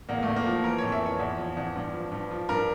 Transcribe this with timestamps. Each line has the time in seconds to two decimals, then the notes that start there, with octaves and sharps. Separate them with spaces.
0.09 E2 A#3
0.23 A3
0.28 E2
0.36 A#3
0.46 F3
0.64 E3 A#4
0.78 F2 C#5
0.92 E5
1.01 E3
1.06 C#5
1.19 E2
1.38 F3
1.57 E2
1.76 G2
1.93 F3
2.12 G2
2.31 F3
2.49 G2 A#4